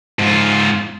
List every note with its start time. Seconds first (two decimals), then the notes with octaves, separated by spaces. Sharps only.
0.19 G#2 F4